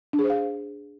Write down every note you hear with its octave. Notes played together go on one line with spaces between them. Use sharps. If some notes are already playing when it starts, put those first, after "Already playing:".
D4
G#4
C5
F5